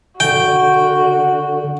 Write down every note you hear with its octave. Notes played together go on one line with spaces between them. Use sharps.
D3 F#4 G5